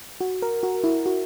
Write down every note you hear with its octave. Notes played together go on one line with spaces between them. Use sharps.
F#4
A#4
F#4
E4
F#4